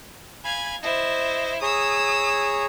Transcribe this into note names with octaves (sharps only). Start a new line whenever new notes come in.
F5 G#5 B5 G#6
E4 C5 D#5
G#4 C#5 A#5 D#6 E6